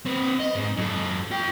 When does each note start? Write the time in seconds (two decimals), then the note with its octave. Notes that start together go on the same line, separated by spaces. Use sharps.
0.06 C4 B4
0.39 D#5
0.55 G#2
0.77 F#2 A4
1.31 F4 G5